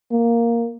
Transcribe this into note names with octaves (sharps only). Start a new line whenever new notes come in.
A#3